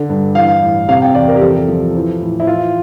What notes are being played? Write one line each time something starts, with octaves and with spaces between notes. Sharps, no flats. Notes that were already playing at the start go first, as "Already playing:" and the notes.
Already playing: D3
G2
E3 F5
A2
C3 F5
G5
E2 D5
A#4
G4
F3 A4
F3
E3
A2
E4
E3 F4